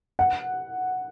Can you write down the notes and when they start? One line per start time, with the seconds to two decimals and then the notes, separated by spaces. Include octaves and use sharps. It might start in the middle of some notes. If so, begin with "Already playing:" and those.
0.19 F#5